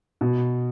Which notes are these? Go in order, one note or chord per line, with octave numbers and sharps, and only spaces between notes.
B2